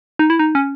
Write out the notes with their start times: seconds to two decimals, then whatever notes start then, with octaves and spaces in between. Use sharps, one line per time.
0.19 D#4
0.30 E4
0.39 D#4
0.55 C#4